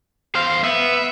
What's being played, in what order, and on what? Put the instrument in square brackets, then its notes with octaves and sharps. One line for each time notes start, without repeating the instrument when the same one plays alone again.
[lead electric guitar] E2 C5 [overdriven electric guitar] F5
[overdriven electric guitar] B3 [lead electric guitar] E5